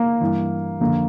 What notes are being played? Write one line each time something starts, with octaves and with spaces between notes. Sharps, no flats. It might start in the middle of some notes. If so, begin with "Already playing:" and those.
Already playing: A#3
G2 E3
F2 D3 A#3